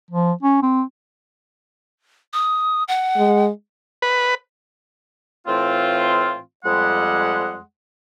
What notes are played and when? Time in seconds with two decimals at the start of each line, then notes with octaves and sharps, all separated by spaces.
0.11 F3
0.43 C#4
0.63 C4
2.33 D#6
2.88 F#5
3.17 G#3
4.02 B4
5.46 A2 E3 A3 C4 F4
6.65 F2 G3 G#3 F#5